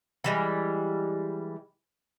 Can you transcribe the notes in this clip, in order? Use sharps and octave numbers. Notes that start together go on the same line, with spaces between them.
E3 G3 G#3